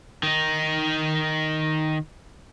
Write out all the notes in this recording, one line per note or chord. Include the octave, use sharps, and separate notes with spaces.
D#3 D#4